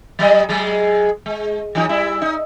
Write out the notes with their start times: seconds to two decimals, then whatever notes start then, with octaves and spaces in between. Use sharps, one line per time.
0.19 F#3 G3 D#5
0.49 F#3 G#3
1.26 G#3
1.75 E3 F#3 D#4
1.89 G3 E4
2.22 D#4